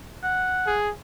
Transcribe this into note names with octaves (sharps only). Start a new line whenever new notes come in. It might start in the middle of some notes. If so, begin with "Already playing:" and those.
F#5
G#4